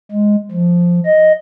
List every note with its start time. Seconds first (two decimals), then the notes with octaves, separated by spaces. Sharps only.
0.11 G#3
0.52 F3
1.06 D#5